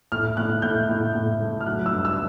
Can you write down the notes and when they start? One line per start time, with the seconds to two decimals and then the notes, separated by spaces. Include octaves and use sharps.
0.12 A2 F6
0.37 A2 F#6
0.62 A2 G6
0.89 A2
1.15 A2
1.40 A3
1.61 F6
1.66 F#3 F#6
1.86 E6
1.92 G2
2.05 E6